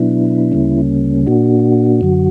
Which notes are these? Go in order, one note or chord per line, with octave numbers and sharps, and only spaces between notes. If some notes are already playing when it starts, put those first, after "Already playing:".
Already playing: B2 F#3 B3 D4 E4
D2 C#3 G3 A#3 C#4
A#2 A#3 D4 F#4
F#2 D3 F#3